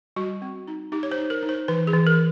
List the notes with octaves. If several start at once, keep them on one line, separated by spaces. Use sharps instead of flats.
G3 F#4
C4
D#4
D#4 G4
C#5
C5
D#4
A#4
D#4
C5
E3 B4
G#4
E3
A#4